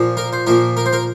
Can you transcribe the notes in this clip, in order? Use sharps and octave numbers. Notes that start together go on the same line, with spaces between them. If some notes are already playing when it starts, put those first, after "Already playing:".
Already playing: A#2 F3
A#4
C5
A#2 F3 A#4
A#4
C5
A#4